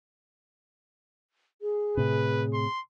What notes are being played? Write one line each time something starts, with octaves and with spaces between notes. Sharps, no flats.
G#4
A2 C3 B4
C6